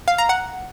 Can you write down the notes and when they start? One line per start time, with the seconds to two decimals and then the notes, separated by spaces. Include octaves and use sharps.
0.08 F5
0.18 A#5
0.29 F#5